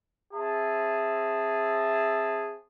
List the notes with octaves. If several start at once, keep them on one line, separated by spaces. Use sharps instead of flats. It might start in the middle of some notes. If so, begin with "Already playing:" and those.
C4 G#4 E5 A5